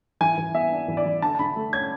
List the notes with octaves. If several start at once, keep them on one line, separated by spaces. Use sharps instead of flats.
E3 G#5
E3
B3 E5
D4
E3
D5
E3
D3 A5
A5
D3 B5
A3
C#4 G#6